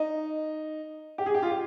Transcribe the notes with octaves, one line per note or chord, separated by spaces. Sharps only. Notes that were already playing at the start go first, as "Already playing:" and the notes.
Already playing: D#4
G4
G#4
G4
F4
G4